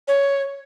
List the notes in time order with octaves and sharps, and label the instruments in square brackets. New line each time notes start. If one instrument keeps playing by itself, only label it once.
[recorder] C#5